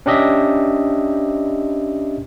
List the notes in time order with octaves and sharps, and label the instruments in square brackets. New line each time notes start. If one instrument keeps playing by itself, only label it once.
[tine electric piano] C#4 D4 G4 D#5 E5